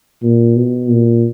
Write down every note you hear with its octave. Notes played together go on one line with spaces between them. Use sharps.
A#2
B2
A#2